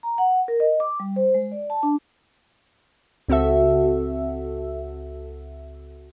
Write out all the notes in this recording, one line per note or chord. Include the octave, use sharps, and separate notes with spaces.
A#5
F#5
A#4
D#5
D6
G3
C5
G#3
D5
A5
D4
C#2 C4 F#4 A4 E5